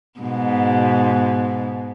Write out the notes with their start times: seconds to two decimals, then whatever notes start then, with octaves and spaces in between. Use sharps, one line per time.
0.20 G#2 B2